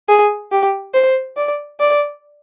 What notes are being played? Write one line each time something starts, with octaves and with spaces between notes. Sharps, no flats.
G#4
G4
C5
D5
D5